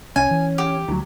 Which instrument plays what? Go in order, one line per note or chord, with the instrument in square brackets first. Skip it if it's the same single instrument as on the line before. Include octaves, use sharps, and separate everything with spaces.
[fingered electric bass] C2 [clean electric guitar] C#4 [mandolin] G#5
[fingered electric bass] E3
[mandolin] G4
[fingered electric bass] D2 [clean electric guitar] D#3 F#3